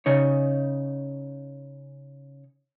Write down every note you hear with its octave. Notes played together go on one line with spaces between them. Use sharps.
C#3 D#4 C#5